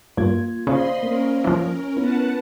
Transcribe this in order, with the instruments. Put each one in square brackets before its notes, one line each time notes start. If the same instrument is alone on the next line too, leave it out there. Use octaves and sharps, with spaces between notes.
[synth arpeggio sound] G2 [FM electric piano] A#3 G#6 [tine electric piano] F4
[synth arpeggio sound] C#3 [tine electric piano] C5 D5 F5 [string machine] D#5 B5 C6
[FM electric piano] A#3 [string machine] C#4 A#4
[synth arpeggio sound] E3 F3
[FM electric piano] B3 [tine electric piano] E4 [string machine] B4 F#5 A5